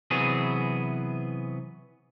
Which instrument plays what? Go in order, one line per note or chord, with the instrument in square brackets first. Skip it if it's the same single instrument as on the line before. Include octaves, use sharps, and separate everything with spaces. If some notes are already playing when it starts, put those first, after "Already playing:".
[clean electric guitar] C3 E3 F#3 B3 G#4